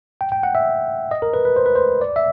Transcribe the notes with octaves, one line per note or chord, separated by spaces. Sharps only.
G5
G5
F#5
E5
D#5
A#4
B4
B4
C5
B4
C5
D5
E5